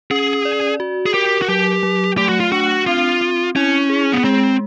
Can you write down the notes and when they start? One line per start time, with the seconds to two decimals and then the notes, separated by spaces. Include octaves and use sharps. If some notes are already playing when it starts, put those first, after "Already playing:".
0.11 C#4 G#4
0.45 D5
0.80 F#4
1.06 G#4
1.14 G4 A#4
1.42 F#4
1.48 F#3 G4
1.83 F#3
2.17 A3 G4
2.29 F#4
2.40 F4
2.52 D4 F#4
2.86 C4 F4
3.21 C4
3.56 C#4 E4
3.89 G#4
4.13 B3
4.24 G#3 C4